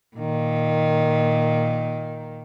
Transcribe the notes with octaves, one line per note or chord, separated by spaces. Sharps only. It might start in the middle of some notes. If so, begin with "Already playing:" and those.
A#2 D#3